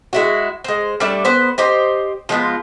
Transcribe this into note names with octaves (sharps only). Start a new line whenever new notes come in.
G#3 E4 F#4
G#3 C5
G3 A3 D4 E5
B3 B4 C5
G4 C5 D#5
F3 G#3 B3 F4